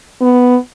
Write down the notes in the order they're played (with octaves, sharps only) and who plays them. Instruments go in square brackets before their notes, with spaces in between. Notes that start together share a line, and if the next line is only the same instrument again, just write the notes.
[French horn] B3